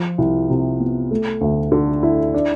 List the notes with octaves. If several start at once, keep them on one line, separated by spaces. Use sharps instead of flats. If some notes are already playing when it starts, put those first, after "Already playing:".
Already playing: F3
C2
C3
B3
A3
D2
D3
E4
D4